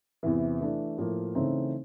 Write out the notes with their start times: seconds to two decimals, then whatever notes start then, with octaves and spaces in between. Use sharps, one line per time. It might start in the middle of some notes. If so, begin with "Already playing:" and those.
0.23 E2 C3 E3
0.61 E3 A3 D4
0.98 A2 F3 A#3
1.35 C#3 E3 A3 C4 D#4